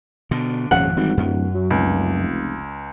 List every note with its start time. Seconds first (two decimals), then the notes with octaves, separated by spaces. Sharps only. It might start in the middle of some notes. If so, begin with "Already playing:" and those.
0.31 B2 D3
0.71 G#1 F2 A#2 C#3 F#5
0.97 G#1 E3 G3
1.17 D1 F#2
1.54 F#3
1.70 F1 C#2